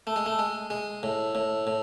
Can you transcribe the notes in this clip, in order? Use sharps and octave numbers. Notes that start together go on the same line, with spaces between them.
A3
G#3
A3
G#3
G#3
A2
A2
A2